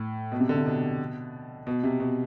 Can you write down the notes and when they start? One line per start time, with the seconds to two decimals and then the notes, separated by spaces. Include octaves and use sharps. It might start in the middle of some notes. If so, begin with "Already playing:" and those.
Already playing: A2
0.32 B2
0.40 C3
0.49 D3
0.57 C3
0.66 B2
1.67 B2
1.83 C3
2.00 B2